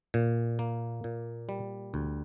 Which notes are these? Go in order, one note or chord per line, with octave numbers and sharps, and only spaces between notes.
A#2
A#3
A#2
G3
D2